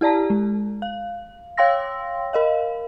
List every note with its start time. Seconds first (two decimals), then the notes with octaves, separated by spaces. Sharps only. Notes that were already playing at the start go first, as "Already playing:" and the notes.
0.01 E4 G4 D5 A5 A#5
0.30 G#3
0.82 F5
1.57 C#5 F5 G5 C6 E6 A#6
2.33 A#4 D#5 F5